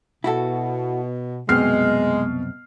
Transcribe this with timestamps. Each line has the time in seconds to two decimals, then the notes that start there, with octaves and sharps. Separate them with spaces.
0.24 B2 E4 F#4 A4
1.49 C2 F#2 B2 G#3 C4 F6 C7